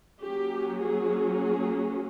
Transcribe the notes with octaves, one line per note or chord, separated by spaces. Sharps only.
F#3 A#3 C#4 G4
G#4
G#4